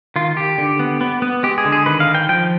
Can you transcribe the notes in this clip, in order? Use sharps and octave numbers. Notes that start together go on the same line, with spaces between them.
D#3 F4
D#3 G4
D3
B3
B3
B3
G#3 G4
G#4
D3
G#4
D#3 B4
F5
D#3
G5
F3 G5